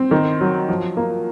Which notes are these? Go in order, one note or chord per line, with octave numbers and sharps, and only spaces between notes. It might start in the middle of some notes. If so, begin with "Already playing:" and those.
Already playing: C4
D#3
F#3
F3
A#3